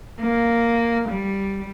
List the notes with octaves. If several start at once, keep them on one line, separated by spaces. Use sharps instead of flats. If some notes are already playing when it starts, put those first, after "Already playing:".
A#3
G3